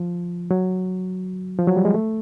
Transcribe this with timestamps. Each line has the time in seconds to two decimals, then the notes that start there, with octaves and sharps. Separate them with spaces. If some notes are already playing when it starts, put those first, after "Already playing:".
Already playing: F3
0.51 F#3
1.59 F3
1.67 F#3
1.76 G3
1.85 G#3
1.94 A3